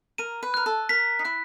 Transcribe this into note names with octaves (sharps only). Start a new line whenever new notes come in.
A#4 D#7
B4
A#4 F#6
A4
A#4 B6
D#4
E4 F#6